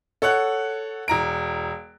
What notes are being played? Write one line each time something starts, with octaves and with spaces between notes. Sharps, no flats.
A4 C#5 F#5 F#6
E1 A#5 D7